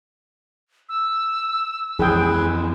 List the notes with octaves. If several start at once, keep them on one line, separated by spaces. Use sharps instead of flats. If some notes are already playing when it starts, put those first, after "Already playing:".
E6
F2 E3 G#3 G#4 B4 G5